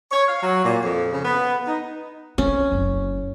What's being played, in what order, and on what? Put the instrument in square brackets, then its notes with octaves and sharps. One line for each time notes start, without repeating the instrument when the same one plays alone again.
[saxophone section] C#5
F5
F#3
A#2
F2
C#3
B3
D#4
[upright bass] C4 [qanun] C#4
[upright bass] F#1